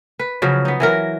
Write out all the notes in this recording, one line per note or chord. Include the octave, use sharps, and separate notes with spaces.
B4
C#3 F3 F#3
B3 D#4
E3 F#3 A#4